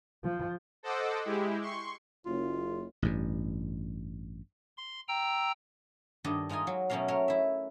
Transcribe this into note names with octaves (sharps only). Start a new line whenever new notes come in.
F3
A4 C5 D#5 F#5 D6 E6
G#3 E4 G4
C6 C#6
F#1 F4
A1 G2
C6
G5 A#5 E6
G2 D#3 D4 A4 D#5
G#3 D#4 F4 D#5 G#5
F#3
B2 F#3 A3 C#4 A#4 F5
A3 A#4 C#5
E4 E5